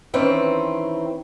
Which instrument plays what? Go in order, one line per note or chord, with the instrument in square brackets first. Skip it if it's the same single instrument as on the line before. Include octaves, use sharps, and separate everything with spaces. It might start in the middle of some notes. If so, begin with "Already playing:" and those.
[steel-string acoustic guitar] D#3 E3 C4 C#4 B4